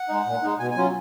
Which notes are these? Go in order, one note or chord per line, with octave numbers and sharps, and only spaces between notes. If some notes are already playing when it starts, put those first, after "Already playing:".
Already playing: F#5
G#3 D#4
A#2
G#3 D#4
B2 G#5
G#5
F#3 C#4 F4